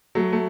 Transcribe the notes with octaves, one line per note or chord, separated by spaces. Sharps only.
F#3 A3
A3